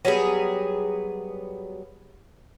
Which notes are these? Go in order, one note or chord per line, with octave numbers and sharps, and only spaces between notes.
F#3 G3 B3 G#4